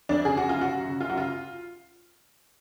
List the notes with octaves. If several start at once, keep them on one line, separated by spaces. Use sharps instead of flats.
F2 D4
C#3 G#4
F#2 F#4
F4
C#3
F#4
F#2
C#3
F#2 F4
F#4
C#3 F4